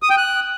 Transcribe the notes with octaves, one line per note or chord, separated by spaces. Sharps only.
D#6
G5
F#6